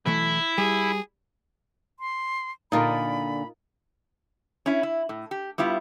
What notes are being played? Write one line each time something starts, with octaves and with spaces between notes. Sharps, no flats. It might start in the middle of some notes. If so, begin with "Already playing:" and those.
B1 E3 A3 E4
G3 G#4
C6
A#2 D3 D#4 F4 A#4 B5
C#4 E4
E4
A2
G4
G3 B3 E4 F4